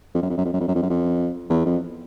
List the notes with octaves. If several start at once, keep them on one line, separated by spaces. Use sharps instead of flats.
F2
F#2
F2
F#2
F2
F#2
F2
F#2
F2
F#2
F2
E2
F2